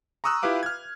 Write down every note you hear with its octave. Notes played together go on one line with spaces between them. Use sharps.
A#5 C#6 D#6 E6 F#6
E4 F4 G4 B4 F5 D6
F6 G#6